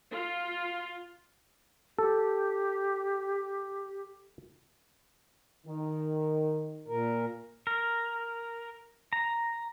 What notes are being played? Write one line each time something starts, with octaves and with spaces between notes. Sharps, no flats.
F4
G4 A4
D#3
A#2 A#4
A#4
A#5